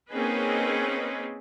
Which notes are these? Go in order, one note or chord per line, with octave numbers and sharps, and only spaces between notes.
A#3 C4 C#4 D#4 G#4 B4